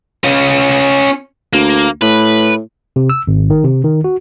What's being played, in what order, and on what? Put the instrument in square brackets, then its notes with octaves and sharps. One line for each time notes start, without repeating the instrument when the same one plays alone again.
[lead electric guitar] C#4 F4
[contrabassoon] D2 [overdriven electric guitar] A#3
[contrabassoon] A2 [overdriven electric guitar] B4
[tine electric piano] C3
E6
G#1
D#3
C3
D#3
F#4